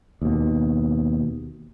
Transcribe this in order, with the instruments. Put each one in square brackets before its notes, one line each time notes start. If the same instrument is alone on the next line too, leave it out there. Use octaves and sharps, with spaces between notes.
[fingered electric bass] D#2 B2